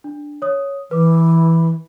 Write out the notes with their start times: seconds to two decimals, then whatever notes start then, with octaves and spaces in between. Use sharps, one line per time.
0.04 D4
0.42 C#5 D#6
0.91 E3 B4 D6